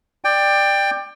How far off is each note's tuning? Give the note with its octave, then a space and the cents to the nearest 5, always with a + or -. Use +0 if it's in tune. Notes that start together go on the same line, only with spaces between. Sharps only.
D5 +15 G5 +15